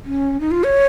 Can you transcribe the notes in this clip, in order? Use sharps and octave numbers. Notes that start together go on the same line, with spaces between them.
C#4
D#4
F4
C#5